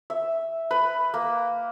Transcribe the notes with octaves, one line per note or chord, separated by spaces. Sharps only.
E5
B4
A#3